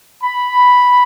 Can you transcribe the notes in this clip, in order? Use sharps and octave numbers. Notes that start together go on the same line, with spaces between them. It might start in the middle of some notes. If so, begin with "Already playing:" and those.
B5